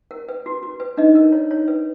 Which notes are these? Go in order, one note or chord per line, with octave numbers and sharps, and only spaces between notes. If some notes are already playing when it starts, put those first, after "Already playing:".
A#4
B4
F#4
F#4
B4
D4 D#4 D#5
A#4
C#5
C#5
B4